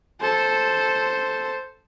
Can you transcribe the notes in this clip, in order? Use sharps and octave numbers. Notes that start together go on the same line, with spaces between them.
A4 C5